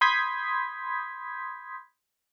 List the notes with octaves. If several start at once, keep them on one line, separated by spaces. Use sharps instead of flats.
B5 C6 D#6 G6 G#6 B6